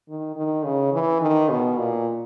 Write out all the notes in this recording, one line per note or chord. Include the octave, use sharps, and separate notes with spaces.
D#3
D#3
C#3
E3
D#3
B2
A#2